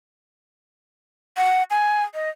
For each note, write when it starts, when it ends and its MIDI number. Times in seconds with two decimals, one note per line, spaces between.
1.37 1.63 78
1.71 2.04 80
2.14 2.29 75